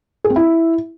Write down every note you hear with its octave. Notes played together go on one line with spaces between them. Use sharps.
G#4
C4
E4